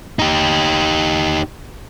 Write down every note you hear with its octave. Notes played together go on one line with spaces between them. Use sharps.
D#4 G4